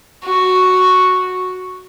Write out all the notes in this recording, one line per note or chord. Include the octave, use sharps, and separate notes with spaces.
F#4